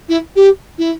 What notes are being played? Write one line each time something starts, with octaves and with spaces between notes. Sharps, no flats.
E4
G4
E4